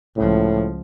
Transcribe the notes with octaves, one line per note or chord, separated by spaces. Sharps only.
C#2 A2 F3